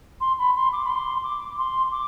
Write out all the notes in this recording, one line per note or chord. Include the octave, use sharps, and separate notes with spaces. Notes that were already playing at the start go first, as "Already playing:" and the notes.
C6
B5
C6
D6
B5
C6
D6
C6
D6